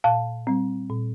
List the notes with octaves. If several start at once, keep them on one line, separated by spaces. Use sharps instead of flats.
A#2 F5 A5
G3 C4
A#2